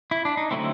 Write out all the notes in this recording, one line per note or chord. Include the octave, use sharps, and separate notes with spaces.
E4
D4
D#4
D3 F#3 A3 C4 E4